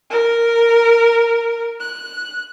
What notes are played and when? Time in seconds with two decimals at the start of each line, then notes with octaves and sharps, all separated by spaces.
0.11 A#4
1.80 F#6